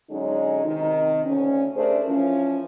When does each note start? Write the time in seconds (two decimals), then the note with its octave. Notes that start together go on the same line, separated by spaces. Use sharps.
0.10 D3 F#3 G#3 C#4 D#4
0.66 C3 D#3
1.25 D2 C#4
1.76 A3 D4 G#4 A#4 C5
2.07 E3 F3 C#4